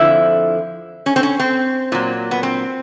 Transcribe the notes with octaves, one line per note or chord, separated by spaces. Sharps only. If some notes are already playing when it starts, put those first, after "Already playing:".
Already playing: F2 D3 F3 E4
C#4
C4
C#4
C4
A#2 F#3
B3
C4